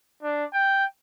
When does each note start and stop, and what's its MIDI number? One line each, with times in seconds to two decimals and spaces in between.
0.23 0.44 62
0.53 0.85 79